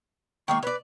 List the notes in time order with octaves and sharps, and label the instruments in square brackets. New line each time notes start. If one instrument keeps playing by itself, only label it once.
[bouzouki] D#3 G#3 A#3 [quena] C#6
[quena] B4 [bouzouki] C#5 D5